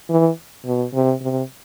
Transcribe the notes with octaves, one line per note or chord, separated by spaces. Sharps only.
E3
B2
C3
C3